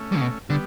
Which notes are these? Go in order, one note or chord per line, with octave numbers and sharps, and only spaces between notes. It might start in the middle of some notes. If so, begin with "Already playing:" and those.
Already playing: A3 C#4
G3
C#3
B2
D3 G3 B3